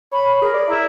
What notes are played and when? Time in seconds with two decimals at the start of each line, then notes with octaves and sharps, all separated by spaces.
0.12 C#5 B5
0.42 G#4 A#4
0.54 D5
0.67 E4 E5 A#5